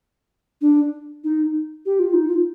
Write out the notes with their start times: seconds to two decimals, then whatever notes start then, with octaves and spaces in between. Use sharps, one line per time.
0.61 D4
1.24 D#4
1.86 G4
1.99 F4
2.14 D#4
2.28 F4